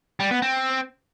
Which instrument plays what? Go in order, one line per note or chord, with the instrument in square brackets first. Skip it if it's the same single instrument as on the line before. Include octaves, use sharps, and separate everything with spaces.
[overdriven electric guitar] G3
B3
C4